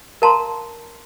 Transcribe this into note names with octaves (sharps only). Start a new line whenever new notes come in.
A#4 F5 A5 A#5 C6